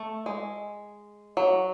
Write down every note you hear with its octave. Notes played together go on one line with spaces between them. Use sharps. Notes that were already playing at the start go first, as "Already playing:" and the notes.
Already playing: A3
G#3
F#3